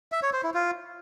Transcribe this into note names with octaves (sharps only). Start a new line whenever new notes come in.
E5
C#5
C5
E4
F4